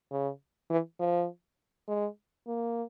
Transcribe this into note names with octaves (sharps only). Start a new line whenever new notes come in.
C#3
E3
F3
G#3
A#3